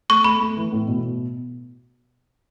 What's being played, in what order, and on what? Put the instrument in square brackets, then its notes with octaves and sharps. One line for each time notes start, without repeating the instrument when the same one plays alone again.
[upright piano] A3 [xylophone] C#6
[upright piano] A3 [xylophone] B5
[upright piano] A3
E3
A2
B2